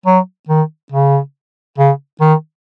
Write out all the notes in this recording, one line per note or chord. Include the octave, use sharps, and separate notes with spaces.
F#3
D#3
C#3
C#3
D#3